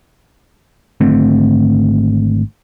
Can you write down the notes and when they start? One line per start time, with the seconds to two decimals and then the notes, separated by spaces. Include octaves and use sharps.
1.01 G#1 D3 A3 C4